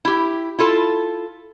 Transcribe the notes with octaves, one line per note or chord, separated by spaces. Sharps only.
E4 G4
E4 F4 A4